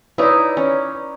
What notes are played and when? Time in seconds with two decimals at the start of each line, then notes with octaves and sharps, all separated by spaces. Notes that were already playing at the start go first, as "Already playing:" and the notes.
0.18 D#4 E4 B4 C#5 D5
0.57 C#4